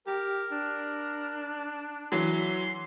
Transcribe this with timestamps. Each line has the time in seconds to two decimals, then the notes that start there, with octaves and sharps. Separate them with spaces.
0.07 G4 A#4
0.51 D4
2.12 E3 F#3 C6